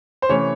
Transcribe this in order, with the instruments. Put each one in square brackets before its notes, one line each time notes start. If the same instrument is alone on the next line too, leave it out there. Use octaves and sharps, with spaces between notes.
[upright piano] C5
[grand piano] C3 E3 A3 C#4 [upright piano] C#5